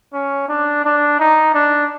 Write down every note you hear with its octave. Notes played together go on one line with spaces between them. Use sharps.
C#4
D4
D4
D#4
D4